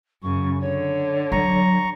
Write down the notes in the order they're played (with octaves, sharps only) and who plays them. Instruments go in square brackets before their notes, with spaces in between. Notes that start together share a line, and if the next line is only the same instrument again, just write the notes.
[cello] F#2 C#3 [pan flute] C#6
[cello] D3 [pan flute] C#5
[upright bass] F#3 [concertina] A#5 C#6